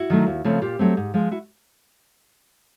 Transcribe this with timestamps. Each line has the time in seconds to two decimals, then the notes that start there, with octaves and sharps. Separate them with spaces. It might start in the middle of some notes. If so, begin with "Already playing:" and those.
Already playing: E4 F#4
0.10 D#3 F#3 A3
0.27 D#2
0.44 C#3 F3 A3 C4
0.62 A#2 F4 G4
0.79 F#3 A3 C4
0.97 G#2
1.14 F3 G#3
1.31 E4 F#4